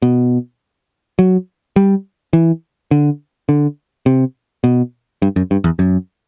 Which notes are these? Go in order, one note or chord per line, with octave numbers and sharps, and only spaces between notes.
B2
F#3
G3
E3
D3
D3
C3
B2
G2
F#2
G2
E2
F#2